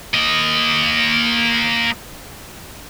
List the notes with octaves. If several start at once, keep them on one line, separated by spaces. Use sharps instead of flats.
A#3 D#5